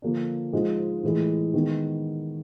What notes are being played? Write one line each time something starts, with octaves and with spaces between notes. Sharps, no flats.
D3 F3 A#3 D4
G#2 F3 G#3
A2 E3 G#3
D#3 G#3 B3